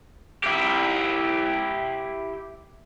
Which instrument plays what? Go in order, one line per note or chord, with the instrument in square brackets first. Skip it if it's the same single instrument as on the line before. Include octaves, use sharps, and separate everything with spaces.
[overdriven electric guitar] E4 G4